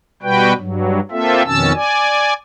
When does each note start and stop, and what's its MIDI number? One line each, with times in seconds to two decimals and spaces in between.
0.23 0.53 47
0.23 0.53 55
0.23 0.53 66
0.23 0.53 71
0.23 0.53 79
0.58 1.00 43
0.58 1.00 54
1.11 1.43 58
1.11 1.43 60
1.11 1.43 65
1.11 1.43 69
1.11 1.43 76
1.46 1.72 41
1.46 1.72 47
1.46 1.72 51
1.46 1.72 61
1.46 1.72 81
1.46 1.72 88
1.75 2.34 74
1.75 2.34 80